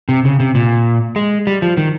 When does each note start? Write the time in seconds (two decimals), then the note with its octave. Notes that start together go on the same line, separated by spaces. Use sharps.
0.09 C3
0.25 C#3
0.40 C3
0.55 A#2
1.16 G#3
1.47 G3
1.62 F3
1.77 D#3